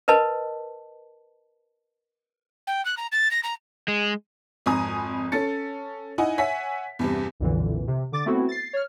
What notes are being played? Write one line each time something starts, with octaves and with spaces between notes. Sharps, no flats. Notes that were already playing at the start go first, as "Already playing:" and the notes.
A#4 B4 D#5 A5
G5
F#6
A#5
A6
A#6
A#5
G#3
G#1 F2 G#5 A#5 D#6
C#4 A4 A6 C#7
D#4 E4 D#5 F#5 G#5
C#5 E5 F#5 G#5 B6
E2 G2 C3
B1 F2 A#2 D3 E3
C3
D3 D6 A6
A3 B3 C4 E4 F#4 A4
A6 C7
C#5 F6